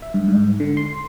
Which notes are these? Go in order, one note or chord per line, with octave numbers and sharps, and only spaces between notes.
E5
G2
G#2
D3
C6